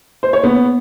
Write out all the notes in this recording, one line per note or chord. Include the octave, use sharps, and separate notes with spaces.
C5
C#5
B3